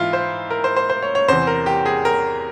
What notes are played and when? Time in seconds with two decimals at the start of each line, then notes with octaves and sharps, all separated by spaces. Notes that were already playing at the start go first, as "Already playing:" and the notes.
Already playing: G#2 E3 E4 F4
0.13 C5
0.51 A#4
0.64 C5
0.76 C5
0.90 C5
1.02 C#5
1.15 C#5
1.28 E2 C3 E3 C5
1.47 A#4
1.66 G4
1.86 G#4
2.05 A#4